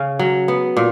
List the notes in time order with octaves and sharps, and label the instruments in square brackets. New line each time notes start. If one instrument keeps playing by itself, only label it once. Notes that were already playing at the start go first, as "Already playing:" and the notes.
Already playing: [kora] C#3
F#3
B3
A#2